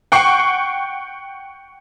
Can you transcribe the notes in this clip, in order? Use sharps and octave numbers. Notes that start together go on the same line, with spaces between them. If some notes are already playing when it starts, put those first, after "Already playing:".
F#5 G5 C#6 C7